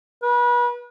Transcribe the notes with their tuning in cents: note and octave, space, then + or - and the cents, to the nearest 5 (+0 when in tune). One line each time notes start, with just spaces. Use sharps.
B4 -35